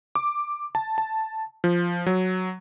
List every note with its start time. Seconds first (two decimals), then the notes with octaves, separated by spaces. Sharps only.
0.15 D6
0.75 A5
0.98 A5
1.64 F3
2.06 F#3